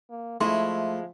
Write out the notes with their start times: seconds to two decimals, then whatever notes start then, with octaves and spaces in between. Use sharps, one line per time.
0.10 A#3
0.41 F3 G#3 A3 E4 C6